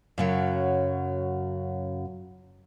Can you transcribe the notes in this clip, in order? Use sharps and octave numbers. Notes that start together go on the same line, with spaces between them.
F#2 C#3 F#3